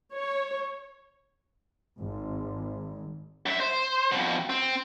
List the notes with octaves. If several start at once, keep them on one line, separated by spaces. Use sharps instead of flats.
C#5
G#1
F#2 E5
C5
F2 B2
C4